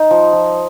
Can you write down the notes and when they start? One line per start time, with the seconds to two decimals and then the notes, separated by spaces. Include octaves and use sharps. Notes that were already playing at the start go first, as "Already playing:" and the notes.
Already playing: D#4
0.11 F3
0.33 F3